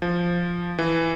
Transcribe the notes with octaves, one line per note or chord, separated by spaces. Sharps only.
F3
E3